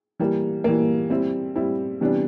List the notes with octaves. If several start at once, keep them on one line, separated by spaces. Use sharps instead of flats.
E3 G3 A#3
E3 G3 A#3
G3 C4 E4
G3 C4 E4
C3 E3 G3 B3 D4